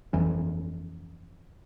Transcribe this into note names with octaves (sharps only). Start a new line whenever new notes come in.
G1 F2 E3 C#4